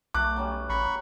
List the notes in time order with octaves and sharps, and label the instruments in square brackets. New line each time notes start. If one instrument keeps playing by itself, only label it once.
[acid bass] B1 [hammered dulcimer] A3 [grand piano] D6 F#6
[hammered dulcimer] F#3 G3 C#4
[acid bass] A1 [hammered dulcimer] A#5 [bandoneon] B5 C#6